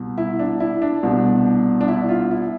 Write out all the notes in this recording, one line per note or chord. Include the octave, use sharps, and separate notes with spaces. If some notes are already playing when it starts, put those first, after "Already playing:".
Already playing: C2 B2
E4
D4
E4
D4
C2 B2
D4
E4
F4
E4